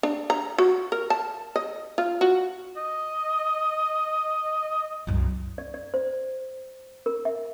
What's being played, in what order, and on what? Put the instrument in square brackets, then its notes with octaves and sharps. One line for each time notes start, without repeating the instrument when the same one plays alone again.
[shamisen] D4
A#5
F#4
A#4
A5
D#5
F4
F#4
[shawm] D#5
[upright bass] C2 F#2
[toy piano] D5
D5
C5
A#4
E5